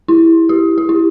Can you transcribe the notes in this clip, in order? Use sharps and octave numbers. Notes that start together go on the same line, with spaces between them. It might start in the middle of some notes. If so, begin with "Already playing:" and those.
E4
G4
G4
E4